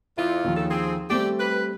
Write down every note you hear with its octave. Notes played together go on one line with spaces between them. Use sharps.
F2 E4 F4
D#2 D#3 F3
C#3 A4
C4 G#4
G3 A3 C4 G4 D5
B4